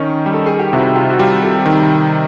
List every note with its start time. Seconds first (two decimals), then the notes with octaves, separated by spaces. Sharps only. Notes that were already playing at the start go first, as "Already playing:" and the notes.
Already playing: D#3 C#4 D#4
0.26 G3
0.33 A4
0.46 G#4
0.59 G4
0.72 C3 E4 F#4
0.95 F4 G4
1.10 F#4
1.19 G3 F4 G4
1.42 G4 A4
1.66 D#3